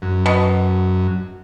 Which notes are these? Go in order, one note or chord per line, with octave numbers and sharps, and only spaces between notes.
F#2
B2